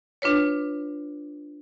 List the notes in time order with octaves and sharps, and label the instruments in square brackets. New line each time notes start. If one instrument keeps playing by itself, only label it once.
[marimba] D4 F4 B4 C#5